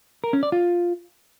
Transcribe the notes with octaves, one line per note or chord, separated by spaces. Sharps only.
A#4
C#4
D5
F4